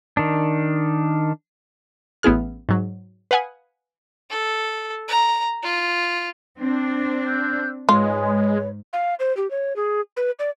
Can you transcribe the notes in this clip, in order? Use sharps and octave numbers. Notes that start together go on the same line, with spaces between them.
D#3 D4
A1 B3 E4 G#4 F6
G#2 F#3
B4 F5 F#5 G#5 D#6
A4
A#5
F4
C4 D4
E6 F#6 G6
G#2 G#3 F4 B4 C#5
F5
C5
G4
C#5
G#4
B4
D5